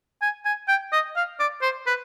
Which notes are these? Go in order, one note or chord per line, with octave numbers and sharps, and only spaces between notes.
G#5
G#5
G5
D#5
F5
D5
C5
B4